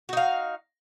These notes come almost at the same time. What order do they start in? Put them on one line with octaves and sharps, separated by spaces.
F#4 D#4 F5